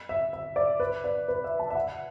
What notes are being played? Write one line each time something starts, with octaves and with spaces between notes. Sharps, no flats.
E5
E5
D5
B4
D5
B4
E5
A5
E5
F#5